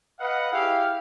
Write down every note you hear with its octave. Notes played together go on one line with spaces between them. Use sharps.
B4 D#5 F5 F#5
E4 G4 G#4 F5